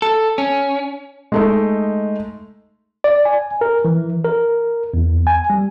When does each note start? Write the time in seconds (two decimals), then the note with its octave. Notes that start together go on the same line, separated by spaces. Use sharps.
0.02 A4
0.38 C#4
1.32 G#3 A3 D#4
3.04 D5
3.25 G#5
3.61 A#4
3.85 E3
4.25 A#4
4.94 E2
5.27 G#5
5.50 G3